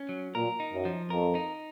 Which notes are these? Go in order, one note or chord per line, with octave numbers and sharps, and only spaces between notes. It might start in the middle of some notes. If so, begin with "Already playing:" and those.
Already playing: C#4
F#3
A#2 A#4
D#4
F#2
F3
F2 A#4
D#4